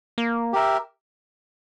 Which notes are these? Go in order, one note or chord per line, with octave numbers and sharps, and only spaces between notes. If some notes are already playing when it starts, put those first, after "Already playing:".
A#3
G4 A#4 E5